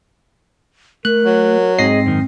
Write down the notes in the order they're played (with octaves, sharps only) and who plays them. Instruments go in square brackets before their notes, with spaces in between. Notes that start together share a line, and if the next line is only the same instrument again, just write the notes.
[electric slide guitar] A3 [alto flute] A#4 [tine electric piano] F#6
[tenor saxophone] F#3
[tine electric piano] G#2 A#6 C7 [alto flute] C4 [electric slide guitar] G#4 D#5
[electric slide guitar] F#2 D#3